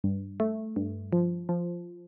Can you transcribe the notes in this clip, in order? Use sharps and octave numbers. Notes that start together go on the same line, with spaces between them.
G2
A3
G2
F3
F3